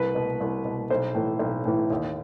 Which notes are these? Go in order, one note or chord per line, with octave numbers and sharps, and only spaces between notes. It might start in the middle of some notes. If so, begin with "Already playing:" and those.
Already playing: C2 B4
B2
C2
B2
B1 C5
A2 E3
B1
A2 E3
D#2